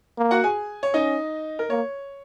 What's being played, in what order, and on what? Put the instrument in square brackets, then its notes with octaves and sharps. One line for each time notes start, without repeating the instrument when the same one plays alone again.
[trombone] A#3
[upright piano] F#4 F#5
G#4 G#5
C#5
[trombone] C#4 [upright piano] D#4 D#5
[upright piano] A#4
[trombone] A#3 [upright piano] C#5